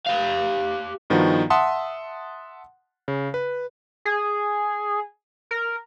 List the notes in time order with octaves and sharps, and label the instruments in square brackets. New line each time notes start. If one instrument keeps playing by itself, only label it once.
[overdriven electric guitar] G4 F5
[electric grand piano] G2 D#3 F3 B3 D#4 F#4
E5 F#5 A5 C6 D#6
C#3
B4
[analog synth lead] G#4
A#4